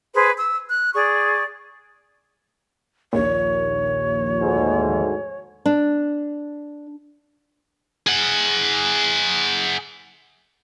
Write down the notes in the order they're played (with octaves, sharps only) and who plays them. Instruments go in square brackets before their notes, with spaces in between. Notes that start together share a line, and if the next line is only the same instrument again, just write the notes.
[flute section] G#4 B4 C5
E6
F#6
G#4 D5 C#6
[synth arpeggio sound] A#1 D#2 A#2 [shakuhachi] C#5
[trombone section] D2 G#2
[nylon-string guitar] D4
[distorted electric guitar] G#4 F#5